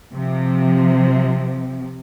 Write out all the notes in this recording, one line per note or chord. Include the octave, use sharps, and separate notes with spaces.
C3 F3